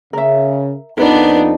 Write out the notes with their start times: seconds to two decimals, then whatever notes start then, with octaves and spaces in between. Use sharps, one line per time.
0.13 C#3 A#4 E5
0.98 F2 B3 D4 D#4 A#4 B4 D5